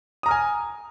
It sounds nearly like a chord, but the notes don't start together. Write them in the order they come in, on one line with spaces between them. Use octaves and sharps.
D#6 A#5 F6 G#5